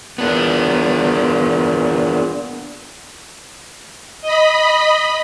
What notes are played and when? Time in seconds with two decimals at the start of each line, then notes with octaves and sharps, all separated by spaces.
0.18 E2 A#2 B3 D4
4.21 D#5 B5